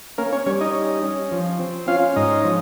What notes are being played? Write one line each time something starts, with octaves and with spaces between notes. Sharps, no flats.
A#3 C#4 A#4
C#4 C#5
G3 C#4 C#5
D#4 D#5
C#4
C#4
F3
C4
C#4 F4 F5
G#2 D#4 D#5
F3